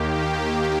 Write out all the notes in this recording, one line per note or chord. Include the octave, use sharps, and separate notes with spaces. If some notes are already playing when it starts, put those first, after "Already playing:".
Already playing: D#2 D#3 A#3 G4
G4